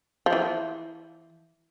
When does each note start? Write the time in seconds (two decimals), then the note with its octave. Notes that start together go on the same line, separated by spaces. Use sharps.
0.26 F3
0.33 E3